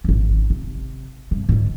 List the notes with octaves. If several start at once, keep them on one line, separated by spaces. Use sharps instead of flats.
G#1 C#4
C3
G2 C3
G#2 D3